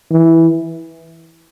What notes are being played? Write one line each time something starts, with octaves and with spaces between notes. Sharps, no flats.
E3